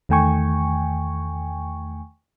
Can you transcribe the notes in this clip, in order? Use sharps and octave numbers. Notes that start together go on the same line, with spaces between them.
E2 D#3 A3 G5 G#5 C#6